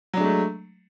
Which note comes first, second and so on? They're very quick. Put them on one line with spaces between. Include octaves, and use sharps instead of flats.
F#3 D4 G#3 A3